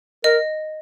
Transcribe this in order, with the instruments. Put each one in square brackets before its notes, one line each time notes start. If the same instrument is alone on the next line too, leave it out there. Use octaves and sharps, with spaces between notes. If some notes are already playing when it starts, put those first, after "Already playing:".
[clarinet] A#4 [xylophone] D#5